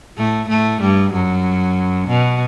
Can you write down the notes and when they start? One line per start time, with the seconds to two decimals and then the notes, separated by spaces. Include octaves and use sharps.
0.18 A2 A3
0.49 A2 A3
0.81 G2 G3
1.13 F#2 F#3
2.08 B2